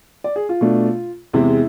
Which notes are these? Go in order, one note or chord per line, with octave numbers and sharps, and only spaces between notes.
D5
G#4
F4
B2 A3 D4
E2 C3 G#3 E4